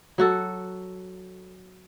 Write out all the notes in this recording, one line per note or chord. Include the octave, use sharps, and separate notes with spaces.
F#3 F#4 A4